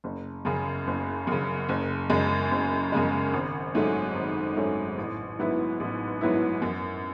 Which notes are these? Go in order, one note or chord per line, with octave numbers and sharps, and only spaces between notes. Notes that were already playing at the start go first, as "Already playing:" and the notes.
F#1
F#2 C#3
F#1
F#2 C#3
F#1
F#2 C#3 G#3
F#1
F#2 C#3 G#3
G#1
G#2 F#3 A3 C#4
G#1
G#2 F#3 A3 C#4
A1
G#2 F#3 B3 E4
A1
G#2 F#3 B3 E4
F#2